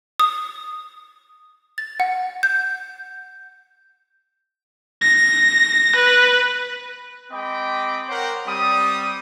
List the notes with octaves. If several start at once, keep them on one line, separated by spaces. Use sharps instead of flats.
D#6
A6
F#5
G6
A#6
B4
G#3 C4 D#5 G5 B5 D6
A#4 C5 C#5 F#5 G5
G3 C4 D#6